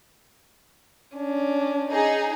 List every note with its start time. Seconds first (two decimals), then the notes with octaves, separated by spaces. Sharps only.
1.17 C#4 D4
1.91 D#4 G#4